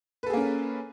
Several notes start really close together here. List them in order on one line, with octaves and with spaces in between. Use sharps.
B4 A4 G#4 A#3 C#4